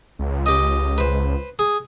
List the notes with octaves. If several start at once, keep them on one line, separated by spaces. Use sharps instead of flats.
C#2
G4 D#5
B4 C5
G#4